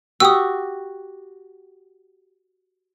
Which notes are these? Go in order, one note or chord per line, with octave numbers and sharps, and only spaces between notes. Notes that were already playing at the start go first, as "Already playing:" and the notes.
F#4 G4 D#6 E6